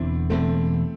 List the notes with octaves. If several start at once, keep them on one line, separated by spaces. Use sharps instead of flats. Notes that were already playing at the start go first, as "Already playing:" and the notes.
Already playing: E1 E2 D3 C4 E4
E1 E2 D3 A3 C4